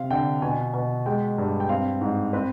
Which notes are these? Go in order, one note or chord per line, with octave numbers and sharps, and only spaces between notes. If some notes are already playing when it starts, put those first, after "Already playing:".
Already playing: C3 C4 F5
D3 G5
B2 G#5
B2
G#3 G5
G2
G5
C4 F5
G#2
C4 B4